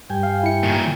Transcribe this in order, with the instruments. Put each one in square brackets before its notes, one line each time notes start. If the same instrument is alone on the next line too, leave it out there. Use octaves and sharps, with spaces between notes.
[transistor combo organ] G2 G5 G#5
[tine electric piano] F5
E4 C#7
[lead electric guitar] A#2 D#3